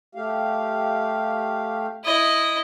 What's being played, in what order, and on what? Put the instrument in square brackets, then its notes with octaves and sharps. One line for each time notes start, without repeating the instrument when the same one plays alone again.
[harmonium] A3 G4 F5
[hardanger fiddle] E4 D#5